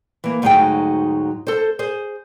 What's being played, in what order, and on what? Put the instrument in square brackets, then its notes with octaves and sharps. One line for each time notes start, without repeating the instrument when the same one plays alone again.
[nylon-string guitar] E3 A#3
D2 G#2 F#3 D#4 G#4 G5
A4 C5
G#4 C5